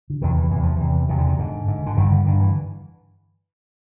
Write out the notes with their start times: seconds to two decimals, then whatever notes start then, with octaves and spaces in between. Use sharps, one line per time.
0.10 D3
0.22 E2 C3 D#3
0.37 E3
0.51 E2 C3 E3
0.63 F3
0.77 E2 C3 E3
1.09 E2 C3 D#3
1.18 D3
1.27 D#3
1.38 G#2 D3
1.68 G#2
1.86 D3
1.97 G2 D3 D#3
2.12 D3
2.26 G2 D3 D#3
2.40 E3